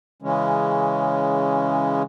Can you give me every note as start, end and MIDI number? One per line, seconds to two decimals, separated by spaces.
0.22 2.02 49
0.22 2.02 52
0.22 2.02 56
0.22 2.02 61